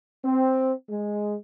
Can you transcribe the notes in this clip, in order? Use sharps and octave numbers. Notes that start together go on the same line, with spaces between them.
C4
G#3